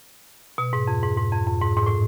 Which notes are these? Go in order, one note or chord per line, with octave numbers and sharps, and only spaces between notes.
B2
G#2
F2
G#2
G#2
F2
F2
G#2
G#2
A2